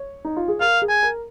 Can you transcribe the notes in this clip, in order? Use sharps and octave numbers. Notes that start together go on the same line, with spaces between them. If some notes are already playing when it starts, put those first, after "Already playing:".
Already playing: C#5
D#4
F4
G#4
A#4 F5
G#4
G#5
A#4